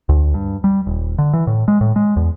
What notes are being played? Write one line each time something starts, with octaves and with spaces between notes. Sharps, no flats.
D2
G2
G3
D#1
D3
E3
A2
G#3
A2
G#3
E2